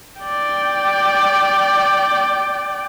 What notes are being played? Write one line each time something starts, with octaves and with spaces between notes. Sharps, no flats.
D5 G5